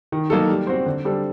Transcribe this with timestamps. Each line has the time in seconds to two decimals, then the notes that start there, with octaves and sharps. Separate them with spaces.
0.12 D#3
0.30 F#3 A#3 D#4 A4
0.49 G3
0.67 C4 F#4 C5
0.86 D3
1.05 G3 D4 A4 C5